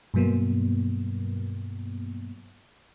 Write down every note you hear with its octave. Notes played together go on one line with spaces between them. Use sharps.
G2 B2 F#3 A#3 B3